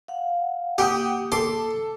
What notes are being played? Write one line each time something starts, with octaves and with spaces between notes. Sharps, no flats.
F5 F#5
A#3 G4 F#5 G5 D#6
A4 C6 D6